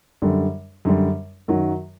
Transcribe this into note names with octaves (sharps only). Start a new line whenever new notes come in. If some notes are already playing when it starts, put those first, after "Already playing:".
F#2 D3 G3
F#2 D3 G3
F#2 D#3 F#3